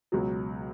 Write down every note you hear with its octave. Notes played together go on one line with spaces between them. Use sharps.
C#2 B2 F#3